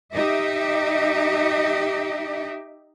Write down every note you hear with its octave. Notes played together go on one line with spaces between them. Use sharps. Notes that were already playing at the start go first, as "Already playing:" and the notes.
D#4 G4 D#5 E5